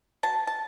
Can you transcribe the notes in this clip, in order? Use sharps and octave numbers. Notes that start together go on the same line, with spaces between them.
F#3 A5
A5